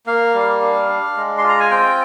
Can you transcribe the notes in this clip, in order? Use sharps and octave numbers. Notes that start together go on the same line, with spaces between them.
A#3 F5
G3
D4
D4
G#3
C6
F4
A#5
G#5
C4 G5